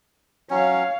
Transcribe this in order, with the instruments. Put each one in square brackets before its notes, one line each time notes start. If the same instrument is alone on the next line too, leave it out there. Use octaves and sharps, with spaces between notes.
[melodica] F#3 C#4 [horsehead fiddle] C#5 F5